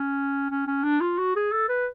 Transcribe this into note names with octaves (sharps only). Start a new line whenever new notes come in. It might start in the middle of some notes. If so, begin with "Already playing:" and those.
Already playing: C#4
C#4
C#4
D4
F4
F#4
G#4
A4
B4